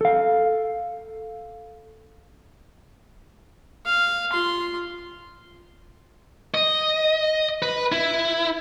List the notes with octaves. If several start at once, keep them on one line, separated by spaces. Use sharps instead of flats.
A4 F5
F5
F4 C6
D#5
B4
E4